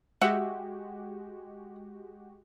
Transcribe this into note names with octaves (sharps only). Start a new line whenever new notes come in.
G#3 F#4 G4 E5 F#5